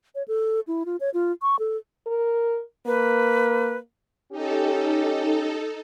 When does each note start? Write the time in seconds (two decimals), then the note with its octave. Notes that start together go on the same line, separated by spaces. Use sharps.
0.15 C#5
0.28 A4
0.67 E4
0.86 F4
1.00 C#5
1.14 F4
1.42 C#6
1.59 A4
2.06 A#4
2.86 A#3 B4
4.32 C#4 D#4 G4 A4